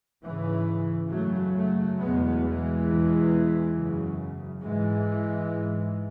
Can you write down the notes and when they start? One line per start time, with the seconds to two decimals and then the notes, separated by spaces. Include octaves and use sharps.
0.23 G#2 C#3 E3
1.11 F#2 C#3 F#3 A3
1.55 F#3 A3
1.99 E2 B2 G#3 B3
2.43 E3 G#3
2.87 E2 B2
3.75 F#2 C#3
4.62 G#2 E3 G#3
5.50 G#2